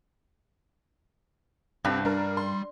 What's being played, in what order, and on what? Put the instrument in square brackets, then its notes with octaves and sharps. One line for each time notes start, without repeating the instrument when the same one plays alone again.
[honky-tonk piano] C2 C3 [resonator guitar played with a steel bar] G2 [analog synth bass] C4
[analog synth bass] G3 [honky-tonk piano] D4 A#4
[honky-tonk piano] C6